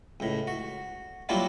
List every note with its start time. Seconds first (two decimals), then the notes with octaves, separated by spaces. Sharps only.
0.20 C#2 A2
0.47 F#4
1.29 F#3 G3 A#3 D4 E4 F4